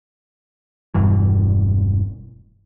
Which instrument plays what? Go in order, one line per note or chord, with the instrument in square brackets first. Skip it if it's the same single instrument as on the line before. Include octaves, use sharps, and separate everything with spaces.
[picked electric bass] E1 G2 E3